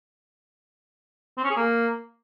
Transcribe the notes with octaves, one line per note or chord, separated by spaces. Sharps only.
C4
C#4
G#4
A#3